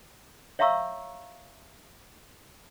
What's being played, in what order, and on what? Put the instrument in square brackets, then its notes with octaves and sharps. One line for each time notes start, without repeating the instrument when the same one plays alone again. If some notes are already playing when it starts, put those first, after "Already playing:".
[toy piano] C#5 E5 F5 A#5 C#6 E6